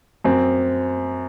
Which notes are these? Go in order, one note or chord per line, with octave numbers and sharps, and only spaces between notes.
F#2 C4